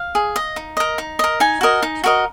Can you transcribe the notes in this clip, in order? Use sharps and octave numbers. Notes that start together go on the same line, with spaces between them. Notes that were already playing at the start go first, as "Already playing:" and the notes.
Already playing: F5
G#4
D#5
D#4
A#4 D#5
D#4
A#4 D#5
D#4 G#5
F#4 A#4 D#5
D#4
F#4 A#4 D#5